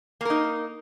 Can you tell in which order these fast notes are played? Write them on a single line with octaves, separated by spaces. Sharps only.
A#3 A#4 D#4